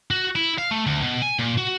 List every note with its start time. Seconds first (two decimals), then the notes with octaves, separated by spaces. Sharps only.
0.11 F#4
0.35 E4
0.58 F5
0.71 A3
0.87 D2
1.02 B2
1.22 G#5
1.39 A#2
1.58 F#4